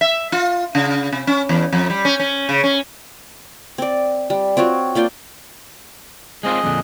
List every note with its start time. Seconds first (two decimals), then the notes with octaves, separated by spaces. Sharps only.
0.01 E5
0.32 F4
0.75 C#3
1.13 C3
1.27 C#4
1.49 E2
1.73 F2
1.90 G3
2.05 C#4
2.20 C#4
2.49 C#3
2.64 C#4
3.78 C4 D5
4.30 G3
4.57 C4 F4 F#4 C#5
4.95 A#3 F4 D5 G5
6.43 G#3 C4 F4 G#4 D#5
6.64 F2 A#2 D3